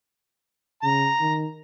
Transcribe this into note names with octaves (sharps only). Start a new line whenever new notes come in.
C#3 A#5
D#3